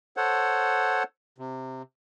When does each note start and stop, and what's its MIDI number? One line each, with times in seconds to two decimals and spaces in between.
0.17 1.03 69
0.17 1.03 72
0.17 1.03 73
0.17 1.03 78
1.38 1.82 48